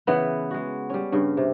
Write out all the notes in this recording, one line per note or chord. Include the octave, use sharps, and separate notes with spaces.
C#3 E3 B3 F#5
G#3 F#4
G3 C#4
G2 C#3
C3